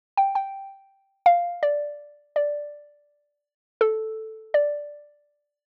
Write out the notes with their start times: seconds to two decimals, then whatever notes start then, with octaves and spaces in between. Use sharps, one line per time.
0.17 G5
0.35 G5
1.26 F5
1.63 D5
2.36 D5
3.81 A4
4.54 D5